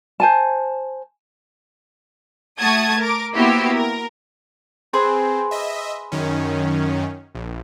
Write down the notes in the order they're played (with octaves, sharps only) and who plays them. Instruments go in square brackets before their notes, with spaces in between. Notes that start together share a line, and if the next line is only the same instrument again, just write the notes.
[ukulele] C5 G#5 A5
[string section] A3 F#4 A5 D#6 G#6
A#4 D6
A#3 B3 E4 F#4 G4 C5
A#4
[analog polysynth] C4 [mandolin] G#4 B4 C5
[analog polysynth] D#5 E5
F#2 D#3 C#4
A#1